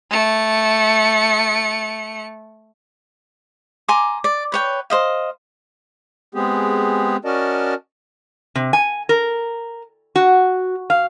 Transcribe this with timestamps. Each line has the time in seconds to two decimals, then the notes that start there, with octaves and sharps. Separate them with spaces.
0.10 A3 C#7
3.88 G#5 A#5 C6 D6
4.24 D5
4.52 B4 C#5 G5
4.90 C5 D#5 F5
6.35 G#3 B3 C4 G4 G#4
7.25 C#4 F#4 A#4 D5 D#5 A5
8.55 C3
8.73 G#5
9.09 A#4
10.16 F#4
10.90 F5